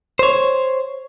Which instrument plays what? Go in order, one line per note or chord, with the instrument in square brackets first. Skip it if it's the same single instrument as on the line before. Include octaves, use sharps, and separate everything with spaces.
[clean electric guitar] C5 C#5